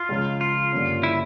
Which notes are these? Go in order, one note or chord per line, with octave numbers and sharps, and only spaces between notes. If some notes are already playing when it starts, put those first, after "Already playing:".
Already playing: F4
C#2 C#3 F3 G#3
F4
G2 D3 F3 A#3 C#4
E4